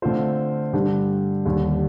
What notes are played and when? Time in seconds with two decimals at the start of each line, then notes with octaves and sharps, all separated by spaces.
0.02 D3 A3 C4 F4 C5
0.73 G2 D3 G3 D4 G4
1.46 D#2 D3 G3